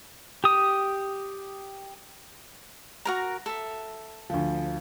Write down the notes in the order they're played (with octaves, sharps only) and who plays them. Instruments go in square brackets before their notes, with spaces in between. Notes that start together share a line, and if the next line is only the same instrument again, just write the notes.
[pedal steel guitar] G4 D#6
[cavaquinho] F#4 A#4 A#5
A4 E5
[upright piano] D2 F3